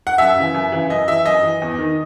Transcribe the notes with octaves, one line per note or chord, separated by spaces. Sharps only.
F#5
F#2 E5
C#3 E3
F#2
C#3 E3
F#2 D#5
E3 E5
F#2 D#5
E3
E2
D#3